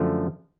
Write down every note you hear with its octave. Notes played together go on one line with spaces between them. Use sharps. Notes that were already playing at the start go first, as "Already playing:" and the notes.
Already playing: F#2 D3 F3 A3